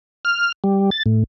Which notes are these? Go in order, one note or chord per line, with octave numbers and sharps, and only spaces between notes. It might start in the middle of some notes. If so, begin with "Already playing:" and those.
F6
G3
A6
A2